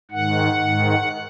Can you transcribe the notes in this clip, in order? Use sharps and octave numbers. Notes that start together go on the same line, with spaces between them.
G#2 D#3 F#5
G#2 D#3